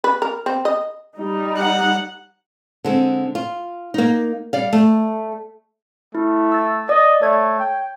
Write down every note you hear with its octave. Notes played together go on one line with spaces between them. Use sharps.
B4
A#4
C4
D#5
G3 D#4
F#5
D3 G#3 C4
F4
A#3 D#4
G3 D5 F5
A3
A3 E4
E6 A6
D5 D#5
A3 C#5 G#6
G5